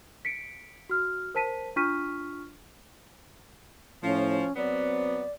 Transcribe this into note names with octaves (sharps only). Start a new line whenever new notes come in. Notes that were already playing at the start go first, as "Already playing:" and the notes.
B6 C#7 D7
F#4 F6
A#4 C5 A5 B6 D#7
D4 F4 C#6 F6 B6 D#7
A2 F3 C#4
F#3 B3 C4 D5